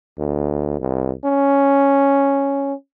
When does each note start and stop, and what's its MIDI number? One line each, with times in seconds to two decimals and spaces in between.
0.18 0.77 38
0.80 1.11 36
1.25 2.74 61